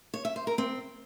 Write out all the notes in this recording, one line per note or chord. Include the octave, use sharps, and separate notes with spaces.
C#5
E5
C5
A#4
C4